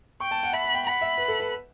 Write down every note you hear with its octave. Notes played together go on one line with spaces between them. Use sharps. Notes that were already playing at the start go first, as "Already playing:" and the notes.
G5 C#6
A5
F#5
E5 B5
F#5
G5
F#5 B5
E5
B4
A4
B4